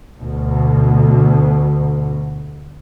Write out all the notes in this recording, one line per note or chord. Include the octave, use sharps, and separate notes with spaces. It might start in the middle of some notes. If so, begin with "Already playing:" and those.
D2 B2